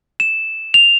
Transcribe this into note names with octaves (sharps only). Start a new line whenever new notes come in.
E7
F7